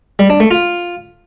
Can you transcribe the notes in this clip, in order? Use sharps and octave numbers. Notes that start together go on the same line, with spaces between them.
G3
D4
A3
F4